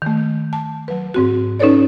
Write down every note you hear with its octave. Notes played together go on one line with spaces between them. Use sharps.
D#3 A3
A5
F#3 B4
G#2 C4 F#4
C#4 D#4 A4 B4 C#5 D5